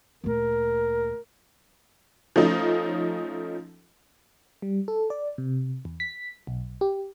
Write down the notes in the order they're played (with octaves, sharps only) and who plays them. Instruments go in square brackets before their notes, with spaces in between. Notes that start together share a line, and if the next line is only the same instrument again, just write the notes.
[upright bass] D2 A#2 [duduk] A#4
[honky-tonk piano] F3 A3 C#4 D#4
[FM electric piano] G3
A4
D5
C3
E2
B6
B1
G4